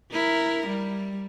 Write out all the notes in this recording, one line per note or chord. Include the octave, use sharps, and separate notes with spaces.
E4 A#4
G3